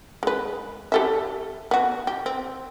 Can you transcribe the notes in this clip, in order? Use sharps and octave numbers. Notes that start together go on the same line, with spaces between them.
G#3 B4
G4 A4 E5
B3 F#4
G4
C4